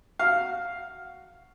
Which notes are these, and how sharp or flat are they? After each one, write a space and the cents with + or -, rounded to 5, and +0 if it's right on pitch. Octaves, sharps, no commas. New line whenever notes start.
F#4 +5 F5 +0